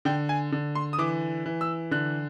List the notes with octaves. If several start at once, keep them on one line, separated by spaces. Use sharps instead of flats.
D3 G5
G#5
D3
C6
D#6
E3 D6
E3
E6
D3 F#6